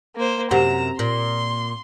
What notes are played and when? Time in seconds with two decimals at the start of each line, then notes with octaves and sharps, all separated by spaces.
0.16 A#3 C5
0.51 F#2 C3 G4 C5 F#5 A#5 E7
0.99 A#2 C6